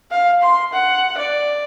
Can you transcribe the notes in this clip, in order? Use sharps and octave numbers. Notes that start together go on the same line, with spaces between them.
F5
C6
F#5
D5